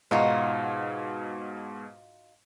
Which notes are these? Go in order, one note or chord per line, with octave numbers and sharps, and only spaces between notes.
G#2 B2 D#4 F4 F#4